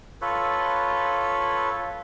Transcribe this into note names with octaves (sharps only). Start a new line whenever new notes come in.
F4 A4 B4 C#5